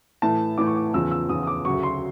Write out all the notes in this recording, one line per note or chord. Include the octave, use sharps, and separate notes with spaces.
A2 E3 A3 A5
A2 E3 A3 D6
C#6
D6
E2 C#3 F3 E6
E6
E2 C#3 F3 D#6
D#6
D6
D2 C#3 F#3 C#6
C6